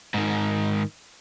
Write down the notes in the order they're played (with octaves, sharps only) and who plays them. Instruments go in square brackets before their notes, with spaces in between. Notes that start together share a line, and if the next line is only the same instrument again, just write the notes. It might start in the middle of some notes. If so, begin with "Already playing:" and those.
[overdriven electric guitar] G#2 D#3